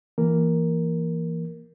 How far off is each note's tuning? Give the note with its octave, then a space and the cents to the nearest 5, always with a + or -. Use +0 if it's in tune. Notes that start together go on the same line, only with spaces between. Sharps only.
E3 +15 A#3 +0 A#4 +0